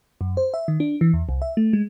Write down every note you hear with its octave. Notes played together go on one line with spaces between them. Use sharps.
F#2
C5
E5
D#3
D4
E3
E2
C2
E5
A3
G#3